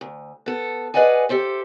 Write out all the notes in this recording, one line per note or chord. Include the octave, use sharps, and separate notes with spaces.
D2
B3 A4
G#4 B4 D5 D#5 F#5 G#5
G4 A4 C5 E5